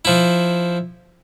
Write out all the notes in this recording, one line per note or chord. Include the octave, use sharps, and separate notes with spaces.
F3 E4